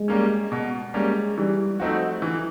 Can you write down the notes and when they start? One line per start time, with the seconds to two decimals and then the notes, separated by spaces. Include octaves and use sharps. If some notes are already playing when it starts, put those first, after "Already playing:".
Already playing: G#3
0.08 G3 A#3 C#4
0.52 B2
0.94 G3 G#3 A#3 C#4
1.37 E3 G3
1.80 F3 A3 C4 D#4 F#4
2.22 E3